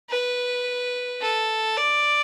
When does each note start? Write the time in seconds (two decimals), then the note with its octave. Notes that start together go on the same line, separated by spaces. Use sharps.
0.10 B4
1.21 A4
1.77 D5